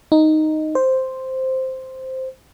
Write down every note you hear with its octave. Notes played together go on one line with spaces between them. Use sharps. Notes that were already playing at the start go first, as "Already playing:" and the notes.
D#4
C5